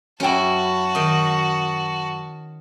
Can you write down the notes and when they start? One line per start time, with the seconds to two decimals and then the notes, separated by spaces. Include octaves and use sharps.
0.20 F#2 C#4 E4 F#4 G5 A5
0.95 D#3 D#5